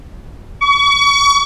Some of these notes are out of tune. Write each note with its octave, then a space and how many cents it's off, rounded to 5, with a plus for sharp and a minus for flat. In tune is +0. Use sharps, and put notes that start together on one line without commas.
C#6 +35